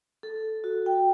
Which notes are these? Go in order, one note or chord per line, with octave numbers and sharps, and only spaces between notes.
A4
F#4
G5